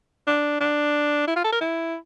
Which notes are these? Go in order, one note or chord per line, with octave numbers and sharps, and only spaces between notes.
D4
D4
E4
F4
A4
A#4
E4